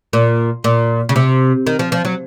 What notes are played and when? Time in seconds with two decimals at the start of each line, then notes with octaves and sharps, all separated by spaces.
0.13 A#2
0.64 A#2
1.09 C#3
1.16 C3
1.67 D#3
1.79 F3
1.92 F3
2.05 F#3